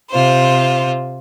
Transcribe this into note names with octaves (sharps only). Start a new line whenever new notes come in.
C3 F4 C5